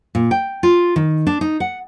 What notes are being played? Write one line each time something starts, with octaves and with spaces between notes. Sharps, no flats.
A#2
G5
F4
D#3
D4
D#4
F#5